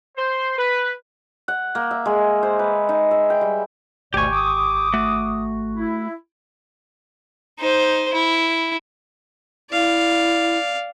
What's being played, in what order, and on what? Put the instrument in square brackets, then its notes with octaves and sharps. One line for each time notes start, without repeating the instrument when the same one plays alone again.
[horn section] C5
B4
[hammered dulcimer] F#5
A#3
E5
G#3
C5
B4
D#4
E5
G5
G3
[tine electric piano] G#1 C#6 [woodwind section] D2 B2 D5 [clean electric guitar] G4 G#5
[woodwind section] D6 D#6
[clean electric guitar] A3 F#4
[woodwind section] E4
[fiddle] D#4 C5
E4
[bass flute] E4 [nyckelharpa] D5 F5